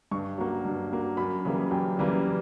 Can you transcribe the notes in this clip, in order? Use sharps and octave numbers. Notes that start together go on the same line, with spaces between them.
G2 C#6
F#3 A#3
G2
F#3 A#3
F#2 B5
C#3 E3 G3 A#3
F#2 G5
C#3 E3 G3 A#3